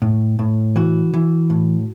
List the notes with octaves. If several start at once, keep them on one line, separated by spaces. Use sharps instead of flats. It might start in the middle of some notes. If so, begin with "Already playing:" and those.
A2
A2
E3 F#4
E3
A2